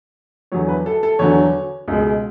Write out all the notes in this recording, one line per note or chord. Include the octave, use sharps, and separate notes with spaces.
E2 D3 F#3 C#5
B4
A4
A4
E2 D3 F#3 C#5
C#2 B2 G#3